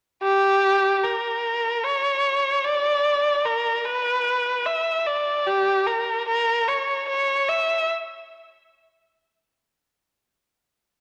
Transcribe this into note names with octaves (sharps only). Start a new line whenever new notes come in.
G4
A#4
C#5
D5
A#4
B4
E5
D5
G4
A#4
A#4
C#5
C#5
E5